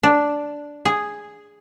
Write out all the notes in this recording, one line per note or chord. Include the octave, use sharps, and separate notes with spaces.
D4
G#4